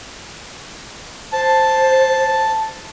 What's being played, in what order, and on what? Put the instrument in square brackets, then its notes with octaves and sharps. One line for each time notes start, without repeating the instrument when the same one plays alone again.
[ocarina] C5 [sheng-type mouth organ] A5